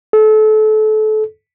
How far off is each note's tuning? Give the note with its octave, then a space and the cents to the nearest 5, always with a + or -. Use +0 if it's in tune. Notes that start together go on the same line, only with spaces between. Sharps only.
A4 -30